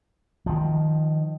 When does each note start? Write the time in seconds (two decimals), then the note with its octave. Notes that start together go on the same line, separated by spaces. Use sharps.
0.46 D#3 F3